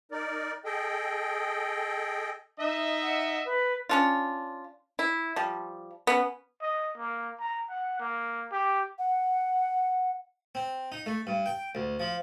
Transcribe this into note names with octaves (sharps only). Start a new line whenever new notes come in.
D#4 A#4 D5
G#4 A4 D#5 G5
D#4 D#5 E5
F#5
B4
C#4 D4 F4
E4
F3 G3
B3 C#4
D#5
A#3
A#5
F#5
A#3
G4
F#5
C4
D#4
A3
G2
G5
D2
F3